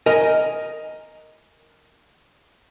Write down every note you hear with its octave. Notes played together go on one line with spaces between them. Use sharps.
A#4 D#5 G#5